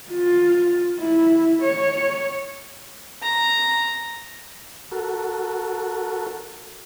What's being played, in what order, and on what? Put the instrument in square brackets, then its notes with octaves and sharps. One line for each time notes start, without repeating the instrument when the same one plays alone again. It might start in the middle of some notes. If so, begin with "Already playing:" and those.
[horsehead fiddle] F4
E4
C#5
[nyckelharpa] A#5
[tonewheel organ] F#4 A4 A#4